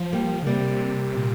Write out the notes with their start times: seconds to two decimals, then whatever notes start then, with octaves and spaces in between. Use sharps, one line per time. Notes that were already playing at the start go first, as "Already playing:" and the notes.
Already playing: F3
0.13 G3 A#3
0.43 D3
0.46 C3 G3 A#3
1.17 A#2